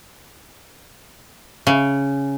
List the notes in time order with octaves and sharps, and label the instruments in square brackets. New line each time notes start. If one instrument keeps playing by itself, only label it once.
[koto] C#3